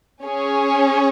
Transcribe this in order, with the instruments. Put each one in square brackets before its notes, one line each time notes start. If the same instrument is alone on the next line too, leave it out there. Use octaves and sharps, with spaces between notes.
[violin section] C#4 G#4 C#5